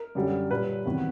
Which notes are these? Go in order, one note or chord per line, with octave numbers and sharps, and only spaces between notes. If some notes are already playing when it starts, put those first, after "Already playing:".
Already playing: A#4
F#2 D3 G3
A#2 G3 A#3 B4
E2 C3 D#3 F#3